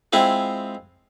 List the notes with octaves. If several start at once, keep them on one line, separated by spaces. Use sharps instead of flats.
G#3 C4 E4 F4 G#4